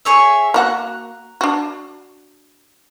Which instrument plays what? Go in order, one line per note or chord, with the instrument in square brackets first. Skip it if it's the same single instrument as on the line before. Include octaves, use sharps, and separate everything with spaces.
[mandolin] G#4 C#5 E5
[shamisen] A#3 F#4 F#5 [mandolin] A#5 F#6
[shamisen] D4 F#4